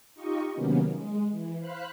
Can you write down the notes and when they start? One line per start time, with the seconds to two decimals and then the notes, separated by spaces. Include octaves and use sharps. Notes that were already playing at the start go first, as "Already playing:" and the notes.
0.15 D#4 F4 G4 D#5 C#6
0.53 C3 D#3 F#3 A#3 B3 C#4
0.90 G#3
1.30 E3
1.60 C5 F5 B5 F#6